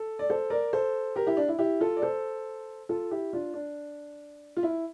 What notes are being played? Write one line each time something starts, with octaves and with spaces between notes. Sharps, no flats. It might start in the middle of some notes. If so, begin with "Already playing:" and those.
Already playing: A4
D5
A4 C5
A#4 D5
A4 C5
G4 A#4
E4 G4
D4
E4
E4 G4
F4 A4
D5
A4 C5
F4 A4
E4 G4
D4 F4
D4
F4
E4